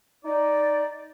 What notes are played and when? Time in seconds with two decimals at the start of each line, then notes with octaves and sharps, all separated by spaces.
0.24 D#4 D5